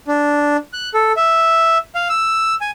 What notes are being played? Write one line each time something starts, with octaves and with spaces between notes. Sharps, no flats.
D4
F#6
A4
E5
F5
E6
G#5